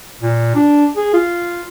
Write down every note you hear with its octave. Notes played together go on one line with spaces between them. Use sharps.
A#2
D4
G#4
F4